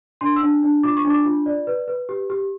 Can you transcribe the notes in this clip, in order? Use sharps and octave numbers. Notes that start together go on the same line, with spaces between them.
D4 C6
E6
D4
D4
F4 D6
C#6
D4
D6
F4
D5
B4
B4
G4
G4